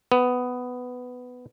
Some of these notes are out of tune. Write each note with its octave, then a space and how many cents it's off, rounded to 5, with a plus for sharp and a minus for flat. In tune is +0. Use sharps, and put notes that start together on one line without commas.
B3 +10